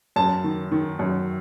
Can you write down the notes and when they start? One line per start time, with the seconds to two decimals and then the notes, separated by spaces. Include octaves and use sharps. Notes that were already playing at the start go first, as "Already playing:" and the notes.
0.16 F#2 A5
0.44 D#3
0.72 D#3
0.99 F#2